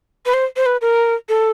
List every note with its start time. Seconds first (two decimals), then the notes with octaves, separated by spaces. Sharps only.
0.26 B4
0.34 C5
0.56 C5
0.66 B4
0.81 A#4
1.29 A4